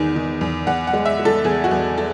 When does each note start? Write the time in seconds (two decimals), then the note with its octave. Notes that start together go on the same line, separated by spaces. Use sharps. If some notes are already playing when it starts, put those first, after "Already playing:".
Already playing: E2 D#3
0.16 D#3
0.41 E2
0.67 E2 F#5
0.87 F#5
0.93 G#3
1.06 E5
1.19 G#3
1.25 A4
1.44 E2 G#4
1.64 F#4
1.71 E2
1.98 A4